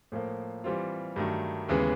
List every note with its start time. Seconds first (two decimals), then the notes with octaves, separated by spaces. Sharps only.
0.12 A2 F3 A#3
0.64 E3 G3 C4 F4
1.16 G2 D#3 F#3 A3
1.69 D#2 C#3 E3 G#3 B3